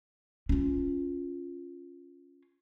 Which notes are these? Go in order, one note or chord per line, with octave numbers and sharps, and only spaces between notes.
C#4 F4